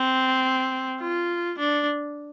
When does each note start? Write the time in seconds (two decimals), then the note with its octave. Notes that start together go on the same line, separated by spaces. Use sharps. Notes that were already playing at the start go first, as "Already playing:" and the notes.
Already playing: C4
1.00 F4
1.59 D4